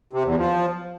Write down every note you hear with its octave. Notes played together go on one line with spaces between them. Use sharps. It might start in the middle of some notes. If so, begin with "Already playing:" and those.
C3
E2
F3